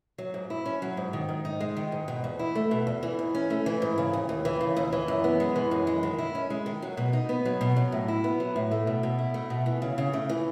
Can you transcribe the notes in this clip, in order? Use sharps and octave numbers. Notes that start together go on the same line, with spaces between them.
F#3
G#2
E4
C#4
F#3
G#2
D#3
G#2
D#4
G#3
D#3
G#2
B2
E2
E4
A3
B2
E2
E3
G#2
C#4
A3
E3
G#2
C#3
D#2
D#2
E3
C#3
D#2
E3
F#2
B3
G#3
E3
F#2
G#3
D#3
E4
C#4
G#3
D#3
F#3
B2
D#4
B3
F#3
B2
F#3
A2
E4
B3
F#3
A2
A3
B2
B2
E4
A3
B2
E3
C#3
C#3
A3
E3